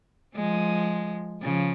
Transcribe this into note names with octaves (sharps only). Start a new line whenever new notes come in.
F3 G#3
C#3 F3